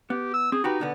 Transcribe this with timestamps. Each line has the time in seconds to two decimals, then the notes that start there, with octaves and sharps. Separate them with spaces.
0.10 B3 G4
0.34 E6
0.52 C4 G#4
0.64 D#4 F#4 G4 B4
0.80 B2 D3 B3